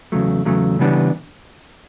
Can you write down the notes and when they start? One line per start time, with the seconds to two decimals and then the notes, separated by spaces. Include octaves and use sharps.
0.12 E2 C#3 F#3 A3
0.45 E2 C#3 F#3 A3
0.79 C#3 E3 G3 B3 D4